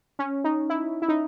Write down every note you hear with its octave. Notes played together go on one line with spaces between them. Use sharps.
C#4
D#4
E4
E4
D#4